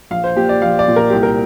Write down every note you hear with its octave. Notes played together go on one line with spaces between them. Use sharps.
A#1 F5
C5
A#2 G4
D5
A#1 F5
D5
A#2
A#4
C2 G4
A#4